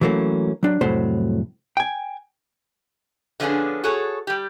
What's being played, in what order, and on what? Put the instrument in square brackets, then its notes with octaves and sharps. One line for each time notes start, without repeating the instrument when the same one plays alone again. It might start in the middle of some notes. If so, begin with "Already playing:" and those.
[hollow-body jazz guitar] E3 F#3 A3 A#3 C#4
F#3 D4
C2 F2 A2 F#3 A3 C5
G5 G#5
[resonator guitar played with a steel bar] D3 F3 B3 C#4 D4 G#4
F#4 G#4 A4 C#5
G3 G4